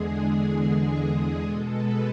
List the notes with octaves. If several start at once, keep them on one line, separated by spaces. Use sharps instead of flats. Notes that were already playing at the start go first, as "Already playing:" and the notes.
Already playing: E2 D3 G#3 G#4
B2 G#3 A4
B4